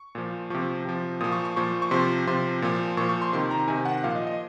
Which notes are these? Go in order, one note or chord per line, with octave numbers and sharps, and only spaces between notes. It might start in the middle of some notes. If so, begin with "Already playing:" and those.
Already playing: C#6
A#2 F3
C3 F3 C#6
C3 F3
A#2 F3 D#6
C#6
C#6
A#2 F3 C#6
C#6
C3 F3 C6
C3 F3 C6
A#2 F3
A#2 F3 C#6
C#6
C6
C3 D#3 C6
A#5
C3 D#3 G#5
F#5
A#2 F3 F5
D#5
D#5